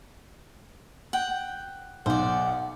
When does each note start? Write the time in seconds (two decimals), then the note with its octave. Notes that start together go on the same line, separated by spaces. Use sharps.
1.13 F#5 G5
2.06 B1 C5 D5 F#5